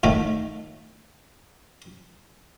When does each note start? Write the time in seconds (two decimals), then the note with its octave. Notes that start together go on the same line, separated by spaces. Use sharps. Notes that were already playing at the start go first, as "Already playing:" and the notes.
0.03 A2 D#3 A3